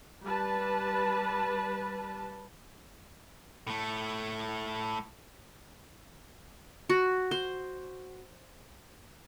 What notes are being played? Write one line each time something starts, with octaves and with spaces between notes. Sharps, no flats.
G3 B4 A5
A2 A3
F#4
C5